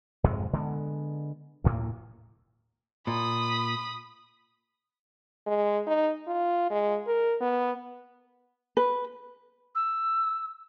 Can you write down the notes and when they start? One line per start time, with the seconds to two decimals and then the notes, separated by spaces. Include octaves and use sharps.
0.24 F2 G#2 C3 G#3
0.53 D3 G#3 B3
1.64 D2 A2 A#3
3.07 A#2 B5 D#6
5.46 G#3
5.87 D#4
6.27 F4
6.70 G#3
7.07 A#4
7.41 B3
8.77 B4
9.75 E6